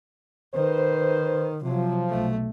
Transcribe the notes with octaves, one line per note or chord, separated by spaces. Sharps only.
D#3 B4 C5
C3 F3 F#3
B1 A3